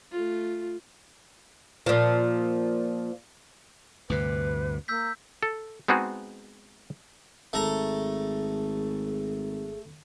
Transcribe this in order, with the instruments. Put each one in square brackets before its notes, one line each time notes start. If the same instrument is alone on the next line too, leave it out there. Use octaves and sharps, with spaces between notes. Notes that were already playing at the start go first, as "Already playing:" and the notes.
[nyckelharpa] A3 F4
[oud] A#2 F3
[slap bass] D2 G2 C3 [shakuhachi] B4
[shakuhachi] A#3 [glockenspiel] E6 G6 B6
[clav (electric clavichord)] A4
G#3 B3 C4 D#4 F#4 G#4
[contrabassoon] G#1 [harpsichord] A3 A#5 [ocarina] G#4